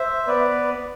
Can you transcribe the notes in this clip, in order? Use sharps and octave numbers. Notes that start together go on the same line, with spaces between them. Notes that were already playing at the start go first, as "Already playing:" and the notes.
Already playing: C5 E5
B3 B4 D5